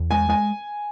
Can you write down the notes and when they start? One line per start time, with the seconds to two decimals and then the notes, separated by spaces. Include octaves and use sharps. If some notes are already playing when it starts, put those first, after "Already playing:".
Already playing: E2
0.11 G#3 G#5
0.29 G#3 G#5